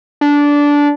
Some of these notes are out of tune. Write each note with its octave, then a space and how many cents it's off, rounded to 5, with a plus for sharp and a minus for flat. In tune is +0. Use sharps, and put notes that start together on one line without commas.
D4 -15